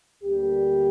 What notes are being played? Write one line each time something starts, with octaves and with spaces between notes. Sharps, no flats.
D2 D3 G3 A#3 G4